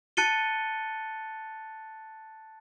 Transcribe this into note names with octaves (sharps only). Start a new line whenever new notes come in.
A5 F#6 A6 C#7 D#7 G7